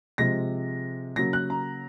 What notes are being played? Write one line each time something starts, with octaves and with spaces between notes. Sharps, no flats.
C3 F3 G#3 A#6
C#3 F#3 A#3 A#6
F#6
A#5